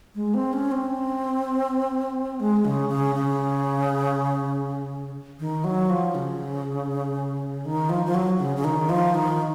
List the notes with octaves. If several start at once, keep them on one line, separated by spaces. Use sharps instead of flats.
G#3
C4
C#4
C4
G#3
C#3
C#3
C#3
D#3
F#3
F3
C#3
D#3
F3
F3
F#3
C#3
C#3
D#3
F3
D#3